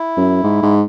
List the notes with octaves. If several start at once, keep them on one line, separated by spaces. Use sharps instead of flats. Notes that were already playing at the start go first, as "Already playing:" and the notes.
Already playing: E4
F#2
G#2
G#2